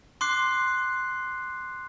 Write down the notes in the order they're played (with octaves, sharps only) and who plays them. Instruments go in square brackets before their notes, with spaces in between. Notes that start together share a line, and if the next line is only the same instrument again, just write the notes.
[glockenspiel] C6 D6 F#6 C7